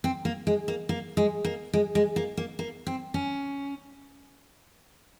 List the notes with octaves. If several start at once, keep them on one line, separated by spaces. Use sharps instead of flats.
C4
A#3
G#3
A#3
A#3
G#3
A#3
G#3
G#3
A#3
A#3
A#3
C4
C#4